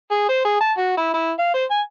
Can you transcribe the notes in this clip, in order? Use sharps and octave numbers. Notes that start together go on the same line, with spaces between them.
G#4
C5
G#4
A5
F#4
E4
E4
F5
C5
G#5